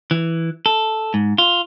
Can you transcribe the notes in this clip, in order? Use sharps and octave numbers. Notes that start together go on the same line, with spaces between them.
E3
A4
G#2
F4